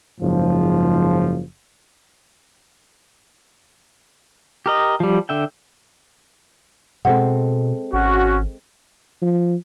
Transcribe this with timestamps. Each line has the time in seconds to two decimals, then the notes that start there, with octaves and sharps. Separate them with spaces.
0.20 F#1 G#2 F3
4.66 G4 A#4 D#5
5.00 F3 G3
5.29 D3 E5 G5
7.05 B2 G#3 C4 A4 F#5
7.93 G#1 C#4 F#4
9.22 F3